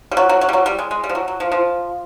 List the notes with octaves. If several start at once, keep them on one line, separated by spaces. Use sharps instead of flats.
G3
F#3
F#3
F#3
G3
F#3
G3
G#3
G#3
G3
F3
F#3
F#3
F3
F3